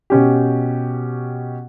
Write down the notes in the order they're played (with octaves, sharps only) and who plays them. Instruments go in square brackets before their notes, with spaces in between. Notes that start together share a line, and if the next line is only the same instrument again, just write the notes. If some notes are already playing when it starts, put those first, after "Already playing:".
[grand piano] B2 C#4 G4